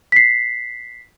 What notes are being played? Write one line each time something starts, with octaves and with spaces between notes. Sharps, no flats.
B6 C7